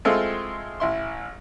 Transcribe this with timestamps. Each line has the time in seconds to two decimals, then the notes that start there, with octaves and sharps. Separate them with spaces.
0.05 G#3 A3 C4 E4 F4 A4
0.80 A1 E4 C6